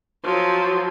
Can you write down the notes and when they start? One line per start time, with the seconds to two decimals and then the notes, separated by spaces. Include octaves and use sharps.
0.24 F3 F#3